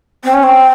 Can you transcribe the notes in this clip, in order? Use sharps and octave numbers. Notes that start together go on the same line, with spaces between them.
C4
C#4
C4